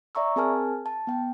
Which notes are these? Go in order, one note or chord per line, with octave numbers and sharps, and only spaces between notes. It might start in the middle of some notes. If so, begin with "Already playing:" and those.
D5 E5 A#5 C#6 E6
C4 G#4 A#4 G#5 A5 F6
A5
B3 G5